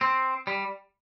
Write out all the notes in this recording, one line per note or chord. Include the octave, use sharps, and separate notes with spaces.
C4
G3